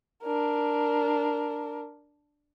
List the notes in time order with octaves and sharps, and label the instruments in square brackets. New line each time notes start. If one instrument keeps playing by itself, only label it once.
[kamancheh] D4 A#4